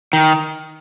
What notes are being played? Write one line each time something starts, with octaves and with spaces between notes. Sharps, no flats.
D#3